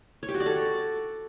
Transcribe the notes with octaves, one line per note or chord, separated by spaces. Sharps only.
C#5
G4
F#4
D5
A4